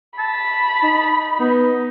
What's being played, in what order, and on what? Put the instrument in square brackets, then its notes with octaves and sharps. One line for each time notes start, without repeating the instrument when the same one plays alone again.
[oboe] A5 [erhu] B5
[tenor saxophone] D#4
[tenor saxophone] B3 [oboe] D#4